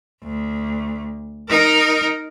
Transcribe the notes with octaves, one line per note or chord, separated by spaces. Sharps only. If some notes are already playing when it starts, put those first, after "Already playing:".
D2
D#4 A#4